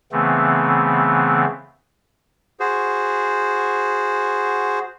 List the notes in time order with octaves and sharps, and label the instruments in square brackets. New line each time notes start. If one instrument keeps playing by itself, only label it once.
[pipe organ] C#3 E3 A3 B3 C4
[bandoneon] F#4 G#4 C5